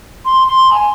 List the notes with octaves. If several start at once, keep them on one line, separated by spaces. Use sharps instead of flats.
C6
C6
G#5